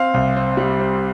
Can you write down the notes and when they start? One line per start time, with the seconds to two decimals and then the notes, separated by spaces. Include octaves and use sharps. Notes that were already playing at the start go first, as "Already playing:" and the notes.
Already playing: C4 F5
0.14 C2
0.36 C4
0.57 G3
0.79 C4